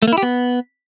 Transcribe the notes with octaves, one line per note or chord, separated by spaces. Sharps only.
A3
A#3
E4
G4
B3